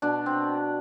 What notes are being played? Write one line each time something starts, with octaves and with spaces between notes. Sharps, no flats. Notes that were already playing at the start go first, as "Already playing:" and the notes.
B2 D4
B2 C4